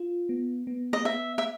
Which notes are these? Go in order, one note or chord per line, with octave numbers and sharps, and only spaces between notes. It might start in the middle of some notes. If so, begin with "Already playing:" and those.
Already playing: F4
B3
B3
D#5
B3 E5
E5